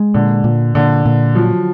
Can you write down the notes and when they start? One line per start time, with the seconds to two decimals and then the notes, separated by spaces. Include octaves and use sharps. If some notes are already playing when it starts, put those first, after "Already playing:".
Already playing: G#3
0.14 A#2 D3
0.44 A#2
0.75 A#2 D3
1.06 A#2
1.35 F3 F#3